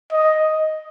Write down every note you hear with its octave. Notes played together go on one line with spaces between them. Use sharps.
D#5